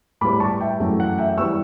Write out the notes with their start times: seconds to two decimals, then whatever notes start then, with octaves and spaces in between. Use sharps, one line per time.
0.21 A2 G3 B3 B5 D6
0.40 A5 C#6
0.61 E5 G5
0.80 F#2 E3 A3
1.00 F#5
1.18 E5 G5
1.38 E3 G3 B3 C#6 E6